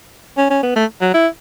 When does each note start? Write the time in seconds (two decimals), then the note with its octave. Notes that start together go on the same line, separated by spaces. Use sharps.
0.37 C#4
0.50 C#4
0.63 B3
0.76 A3
1.01 F#3
1.14 E4